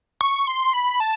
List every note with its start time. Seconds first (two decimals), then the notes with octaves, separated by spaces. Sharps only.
0.21 C#6
0.47 C6
0.73 B5
1.00 A5